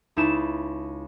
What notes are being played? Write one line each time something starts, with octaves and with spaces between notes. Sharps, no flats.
C#2 D#4 E4 A5 E7